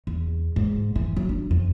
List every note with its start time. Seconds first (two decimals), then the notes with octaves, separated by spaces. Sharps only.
0.07 E2
0.56 G#2
0.96 E3
1.17 F#3
1.29 D4
1.51 F2